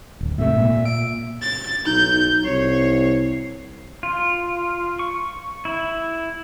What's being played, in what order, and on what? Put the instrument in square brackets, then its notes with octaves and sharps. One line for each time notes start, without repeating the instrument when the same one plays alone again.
[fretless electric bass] D1
[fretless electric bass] G#2 C3 A3 [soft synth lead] E5
[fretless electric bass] A#2
[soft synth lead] D7
[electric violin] A6
[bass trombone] B1 [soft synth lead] D#4 [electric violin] G6
[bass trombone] C2 [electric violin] C#5 [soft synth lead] C7
[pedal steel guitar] F4
C#6
E4